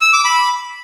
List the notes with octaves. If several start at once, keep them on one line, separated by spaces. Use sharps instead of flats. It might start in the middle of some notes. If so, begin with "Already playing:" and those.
E6
D6
B5